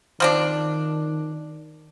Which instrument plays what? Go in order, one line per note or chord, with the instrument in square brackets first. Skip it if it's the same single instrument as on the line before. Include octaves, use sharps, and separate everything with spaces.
[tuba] D#3 [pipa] F3 C4 D4